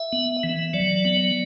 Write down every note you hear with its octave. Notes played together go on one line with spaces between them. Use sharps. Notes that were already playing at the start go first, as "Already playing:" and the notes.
Already playing: E5
B3
E3
F#3 D5
B3